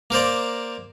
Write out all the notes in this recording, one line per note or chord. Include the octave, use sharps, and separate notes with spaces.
A#3 A#4 C5 D5